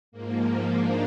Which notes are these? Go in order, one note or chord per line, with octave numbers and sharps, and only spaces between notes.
G#2 A#3
F3
D4